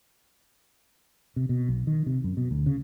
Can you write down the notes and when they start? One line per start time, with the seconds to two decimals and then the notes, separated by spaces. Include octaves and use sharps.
1.36 C3
1.49 B2
1.69 B1
1.87 D#3
2.06 C3
2.24 F#2
2.37 B2
2.51 D2
2.66 C#3